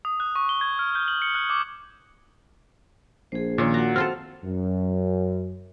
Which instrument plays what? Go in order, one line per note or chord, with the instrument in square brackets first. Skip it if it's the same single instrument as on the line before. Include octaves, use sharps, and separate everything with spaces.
[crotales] D#6
F#6
C#6
G7
G#6
F6
G6
F#7
C#7
F#6
D6
[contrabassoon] A#1 [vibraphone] G#4 C5
[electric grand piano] A#2 [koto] D#3 C#4
[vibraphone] F#4 F#5 [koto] A#5
[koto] C4 F4 A4 [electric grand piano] F6
[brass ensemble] F#2